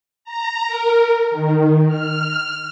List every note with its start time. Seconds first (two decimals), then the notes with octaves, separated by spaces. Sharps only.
0.24 A#5
0.67 A#4
1.31 D#3
1.87 F6